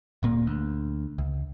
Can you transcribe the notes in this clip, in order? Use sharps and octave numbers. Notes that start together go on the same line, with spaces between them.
D1 A#2 A#3
D2
C#2